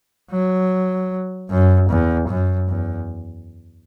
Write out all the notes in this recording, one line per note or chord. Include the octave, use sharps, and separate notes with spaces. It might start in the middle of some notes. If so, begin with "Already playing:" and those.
F#3
F#2
E2
F#2
E2